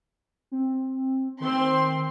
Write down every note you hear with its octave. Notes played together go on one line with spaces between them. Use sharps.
C4
D#3 C4 C6